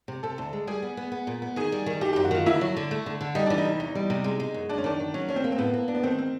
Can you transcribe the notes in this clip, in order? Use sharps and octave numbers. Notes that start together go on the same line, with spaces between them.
C3
C3 A4
D2
G#3
G3 G#4
B3
B3
B3
A#2
B3
D#3 G#4
G3
D#3
D#3 G4
F#2 G4
F#4
D#3 F4
D3 E4
F#3
D3
A3
D3
D3
G3 D#4
E3 D4
D#4
C3
E2
G3
C3
G#3
G#3
F#2
F#2 D4
C#4
D#3 D4
D#3
F#3 C#4
C#4 D4
C4
A#3
C4
A2 B3
A#3
D4
B3
D#3 C4
C4